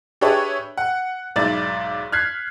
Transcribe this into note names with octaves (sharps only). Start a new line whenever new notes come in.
D4 G4 G#4 B4 C#5 E5
F#5
B1 G#2 E4 D5 A6
F6 F#6 G#6 B6 C7